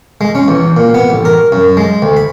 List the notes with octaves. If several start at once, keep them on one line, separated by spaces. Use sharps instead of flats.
G#3
C#4
E2
A#2
B3
A1
A#4
F#2
G#3
D2
B5